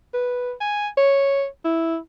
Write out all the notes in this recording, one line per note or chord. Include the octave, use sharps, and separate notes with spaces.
B4
G#5
C#5
E4